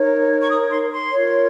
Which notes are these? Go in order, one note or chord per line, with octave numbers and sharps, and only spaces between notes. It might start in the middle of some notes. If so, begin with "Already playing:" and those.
Already playing: D#4 A#4 C#5
C#6
D#6
C6
C6
F4 A#4 C#5